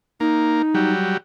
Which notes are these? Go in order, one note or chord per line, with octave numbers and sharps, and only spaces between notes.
A#3 D#4
F#3 G3